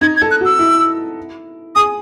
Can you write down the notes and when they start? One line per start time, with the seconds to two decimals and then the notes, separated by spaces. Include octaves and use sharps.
0.01 D#4 G#6
0.17 G#6
0.21 A4
0.31 F#6
0.41 F#4 E6
0.59 E4
1.75 G#4 D#6